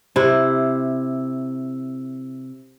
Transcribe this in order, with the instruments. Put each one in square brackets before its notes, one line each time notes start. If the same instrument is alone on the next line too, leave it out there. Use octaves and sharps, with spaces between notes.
[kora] C3 E4